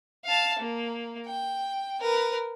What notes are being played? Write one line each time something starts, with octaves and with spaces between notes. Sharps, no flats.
F5 A5
A#3
G5
A#4 B4